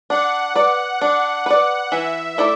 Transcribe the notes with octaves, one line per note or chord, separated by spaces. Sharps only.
D4 F#5
B4 D5
D4
B4 D5
E3 E5
A3 E4 D5